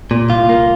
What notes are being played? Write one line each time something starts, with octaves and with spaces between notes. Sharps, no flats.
A#2
C2 F4
A#3